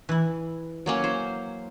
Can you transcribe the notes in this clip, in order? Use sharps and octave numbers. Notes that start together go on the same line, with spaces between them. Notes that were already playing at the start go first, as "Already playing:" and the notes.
E3 E4
F#3 A#3 C#4
C5